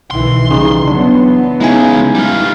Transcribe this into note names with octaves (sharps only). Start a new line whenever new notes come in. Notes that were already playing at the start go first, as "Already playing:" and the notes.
B1 D#3 E3 C6
C#3 E3 G3 D#4
E3 F#3 B3 D4
C#3 G#3 D#4 E4 G#5
G3 F4